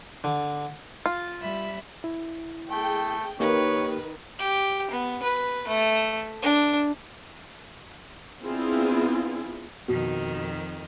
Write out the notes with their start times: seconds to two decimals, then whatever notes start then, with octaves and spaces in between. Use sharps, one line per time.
0.24 D3
1.06 F4
1.40 G3 E5 B5
2.04 E4
2.70 A3 G#4 G5
3.40 D#3 A#3 D#4 G4 B4 C#5
4.39 G4
4.91 B3
5.23 B4
5.68 A3
6.42 D4
8.44 B3 C4 D4 E4 F4 G#4
9.88 F2 B2 D#3